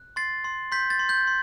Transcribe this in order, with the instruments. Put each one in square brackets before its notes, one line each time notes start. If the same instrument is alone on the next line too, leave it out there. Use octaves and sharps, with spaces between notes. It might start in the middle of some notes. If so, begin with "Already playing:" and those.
Already playing: [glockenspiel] F#6
C6 A6 C7
C6
C6 G6 B6
A6
C6
G6
C6